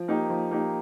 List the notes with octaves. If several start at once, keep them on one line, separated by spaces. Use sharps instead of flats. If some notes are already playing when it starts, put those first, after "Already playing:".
Already playing: F3
A#3 D#4 G4
F3
A#3 D#4 G4